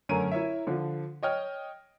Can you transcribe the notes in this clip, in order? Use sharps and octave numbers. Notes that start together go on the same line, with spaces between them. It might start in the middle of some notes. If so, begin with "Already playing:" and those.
F#2 D3 A3 C#4 A#4 D#7
E4 A#4 C#5 E5
D3 F3
C#5 D#5 G5 F6